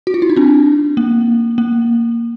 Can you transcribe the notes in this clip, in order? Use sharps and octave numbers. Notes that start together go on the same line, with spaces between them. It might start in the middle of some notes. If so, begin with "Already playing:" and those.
F#4
F4
E4
D#4
C4 D4
A#3
A#3